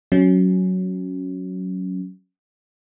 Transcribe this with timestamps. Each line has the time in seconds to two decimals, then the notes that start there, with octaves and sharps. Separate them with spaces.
0.12 F#3 C#4